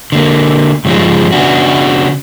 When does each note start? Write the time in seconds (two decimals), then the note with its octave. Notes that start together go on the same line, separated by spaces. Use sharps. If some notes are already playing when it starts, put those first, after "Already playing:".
0.12 D3 A#3
0.85 G2 C#3 F3 G3 G#3
1.32 C#3 B3 D4 F#4